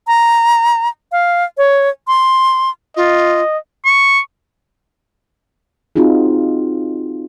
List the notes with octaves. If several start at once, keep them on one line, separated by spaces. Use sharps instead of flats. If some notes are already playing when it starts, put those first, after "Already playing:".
A#5
F5
C#5
C6
F4 D#5
C#6
C4 D#4 F4 F#4 G#4